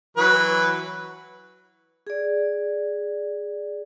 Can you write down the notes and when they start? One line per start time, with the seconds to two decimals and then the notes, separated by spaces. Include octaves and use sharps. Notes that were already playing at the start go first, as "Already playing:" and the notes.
0.17 E3 F#3 B4
2.07 G#4 D5